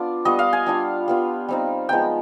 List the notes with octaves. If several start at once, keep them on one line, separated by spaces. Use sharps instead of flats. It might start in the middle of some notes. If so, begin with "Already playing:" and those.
Already playing: B3 D4 F4 D5
G3 B3 F4 D#5
F5
G#5
G3 D4 F4
G3 B3 F4
G3 C4 D#4
F3 G#3 B3 D#4 G5